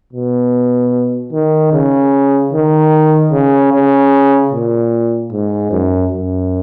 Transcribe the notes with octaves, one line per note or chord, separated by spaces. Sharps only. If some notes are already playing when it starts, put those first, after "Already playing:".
B2
D#3
C#3
D#3
C#3
C#3
A#2
G#2
F#2
F#2